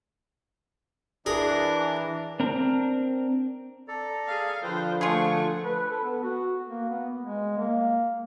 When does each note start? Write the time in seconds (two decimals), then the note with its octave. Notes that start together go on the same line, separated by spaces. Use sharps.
1.26 E3 D4 G#4 A#4
2.40 C4 D4 A#4
3.88 A4 D5 A#5
4.27 G#4 F5
4.63 D3 F3 F4 B4 C5 G5
5.01 A3 D4 F4 G#4 C#6
5.64 B4
5.90 A4
6.04 B3
6.23 F#4
6.68 A#3
6.89 B3
7.20 G#3
7.57 A#3